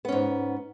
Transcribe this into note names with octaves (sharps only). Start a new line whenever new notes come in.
G#2 B3 C#4